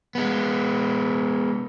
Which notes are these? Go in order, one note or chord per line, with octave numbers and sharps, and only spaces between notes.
G#3 B3